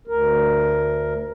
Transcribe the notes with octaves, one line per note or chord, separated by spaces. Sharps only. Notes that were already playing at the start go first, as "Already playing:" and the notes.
D2 A#4